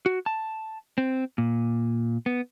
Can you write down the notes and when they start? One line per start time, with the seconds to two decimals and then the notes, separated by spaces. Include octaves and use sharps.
0.06 F#4
0.26 A5
0.98 C4
1.38 A#2
2.26 B3